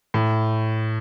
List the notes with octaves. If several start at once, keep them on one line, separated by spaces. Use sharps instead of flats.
A2